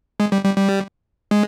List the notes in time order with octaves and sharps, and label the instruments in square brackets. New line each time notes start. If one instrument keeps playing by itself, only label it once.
[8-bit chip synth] G#3
G3
G3
G3
G#3